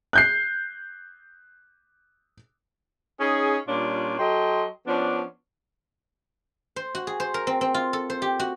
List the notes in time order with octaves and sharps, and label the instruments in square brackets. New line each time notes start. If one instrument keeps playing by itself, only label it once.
[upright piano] F#6 G6 C7
[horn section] C#4 D#4 G#4
A#2 G3 C#4 D4 F4
F#3 A4 D#5 G5 C6
F3 B3 C#4 D4
[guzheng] C5
F#4
G#4
C5
A#4
C4
C4
F4
A4
C5
G4
F#4